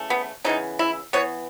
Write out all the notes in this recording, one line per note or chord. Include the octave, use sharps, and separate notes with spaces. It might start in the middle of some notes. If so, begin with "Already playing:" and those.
Already playing: C#3 E3 A3
B3
C#3 E3 B3 D#4
E4
E3 B3 C#5